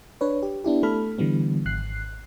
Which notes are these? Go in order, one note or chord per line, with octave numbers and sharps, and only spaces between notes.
D4 B4 C#5
G4
B3 D4 E4 G4
A3 A4 B5 F6
D3 E3 G3 B3
G#1 F#6 C7